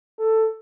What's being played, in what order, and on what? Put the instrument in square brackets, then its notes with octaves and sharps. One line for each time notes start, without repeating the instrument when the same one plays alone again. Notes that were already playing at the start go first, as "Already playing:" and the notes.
[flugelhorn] A4